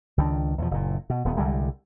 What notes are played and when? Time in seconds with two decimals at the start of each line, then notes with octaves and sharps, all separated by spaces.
0.18 C#2 D#3 E3 D4
0.58 E2 G2 B2 F3
0.71 F#1 A#2
1.10 B2
1.25 D#1 B3
1.37 C2 D3 G3 G#3